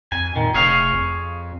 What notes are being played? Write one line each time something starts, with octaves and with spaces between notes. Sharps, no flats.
F2 G#5
A#2 D#3
F1 G#4 C#5 F5
F2